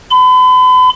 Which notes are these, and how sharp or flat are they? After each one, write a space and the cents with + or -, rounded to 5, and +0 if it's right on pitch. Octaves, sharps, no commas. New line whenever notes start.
B5 +40